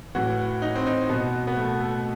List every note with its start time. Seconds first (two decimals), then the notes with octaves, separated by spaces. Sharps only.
0.15 A2 E3 F#4
0.62 D#4
0.75 C4
0.86 D#4
1.09 B2 B3
1.47 B3
1.57 A3
1.80 A3